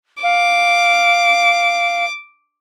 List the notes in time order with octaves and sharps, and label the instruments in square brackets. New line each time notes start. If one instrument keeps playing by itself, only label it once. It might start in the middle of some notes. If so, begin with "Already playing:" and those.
[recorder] F5 [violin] D6